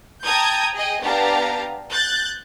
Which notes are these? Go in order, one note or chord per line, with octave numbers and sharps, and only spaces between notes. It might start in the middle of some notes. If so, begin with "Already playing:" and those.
G5 A5 A#5 D#6 G6 G#6
G#4 D#5 G5
B3 D4 G4 F5 A5 A#5
F#6 G6 A6